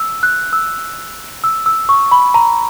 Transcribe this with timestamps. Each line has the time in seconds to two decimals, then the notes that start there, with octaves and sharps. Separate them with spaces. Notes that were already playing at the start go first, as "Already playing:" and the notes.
Already playing: E6
0.23 F#6
0.53 E6
1.44 E6
1.66 E6
1.89 C#6
2.11 B5
2.34 A#5